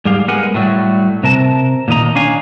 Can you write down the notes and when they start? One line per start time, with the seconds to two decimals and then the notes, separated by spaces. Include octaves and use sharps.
0.05 G#2 G3 G4 G#4 F5
0.28 G#3 B3 A#4 F#5 G#5
0.54 A2 F#3 G3 A3
1.23 C3 A#4 A5
1.88 A#2 D#3 D#5 A#5
2.15 C#4 D4 F5 G#5